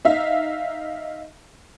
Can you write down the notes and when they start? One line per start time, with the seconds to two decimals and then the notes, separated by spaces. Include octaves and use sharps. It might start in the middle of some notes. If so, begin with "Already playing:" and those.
0.05 D#4 E5 F5